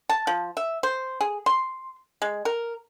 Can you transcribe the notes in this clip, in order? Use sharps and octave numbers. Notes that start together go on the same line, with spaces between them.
A5
F3
E5
C5
G#4
C6
G#3
A#4